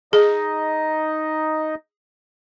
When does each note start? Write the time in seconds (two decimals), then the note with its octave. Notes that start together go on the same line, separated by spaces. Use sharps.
0.13 D#4 G#4 D#5